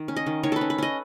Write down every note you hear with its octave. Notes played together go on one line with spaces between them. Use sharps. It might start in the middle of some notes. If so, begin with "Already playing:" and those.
Already playing: D#3
C#4
D#5
D#3
D#3 C#5
A4 B4
C#4
B4
C#4 D#5